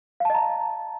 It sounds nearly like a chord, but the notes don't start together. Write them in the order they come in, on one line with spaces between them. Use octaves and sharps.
F5 A5 D#5 A#5